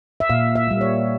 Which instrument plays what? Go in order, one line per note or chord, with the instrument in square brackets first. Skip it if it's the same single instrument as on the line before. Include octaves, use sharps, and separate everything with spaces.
[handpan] E5
A#2 F5
E5
G3 A#3
C#5